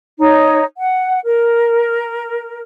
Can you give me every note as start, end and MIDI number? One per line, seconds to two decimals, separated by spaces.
0.19 0.63 63
0.19 0.63 73
0.77 1.18 78
1.24 2.60 70